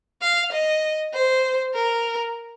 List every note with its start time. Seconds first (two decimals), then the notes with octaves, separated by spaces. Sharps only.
0.22 F5
0.52 D#5
1.14 C5
1.74 A#4